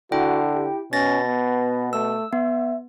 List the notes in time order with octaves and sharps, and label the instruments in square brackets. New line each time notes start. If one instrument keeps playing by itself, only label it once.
[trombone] D3 [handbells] E4 G5 [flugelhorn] F#4
[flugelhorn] G4
[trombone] B2 [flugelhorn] C#4 [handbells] A6 A#6
[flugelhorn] B3
[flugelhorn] A3 [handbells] E6
[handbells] B3 [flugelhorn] E5